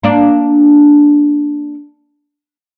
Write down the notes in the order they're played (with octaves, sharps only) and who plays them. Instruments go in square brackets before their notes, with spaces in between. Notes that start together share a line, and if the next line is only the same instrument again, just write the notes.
[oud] A#3 D4